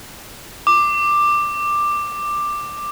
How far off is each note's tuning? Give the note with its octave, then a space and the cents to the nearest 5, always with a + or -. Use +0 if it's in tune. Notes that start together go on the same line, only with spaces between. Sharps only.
D6 +10